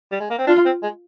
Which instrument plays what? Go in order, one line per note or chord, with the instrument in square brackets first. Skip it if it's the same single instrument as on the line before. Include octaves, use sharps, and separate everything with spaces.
[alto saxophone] G3
G#3
A#3
C4
[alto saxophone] D4 [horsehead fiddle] F4
[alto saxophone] C4
G#3